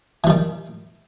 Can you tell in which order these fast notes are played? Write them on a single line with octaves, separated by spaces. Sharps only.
E3 G3 D#3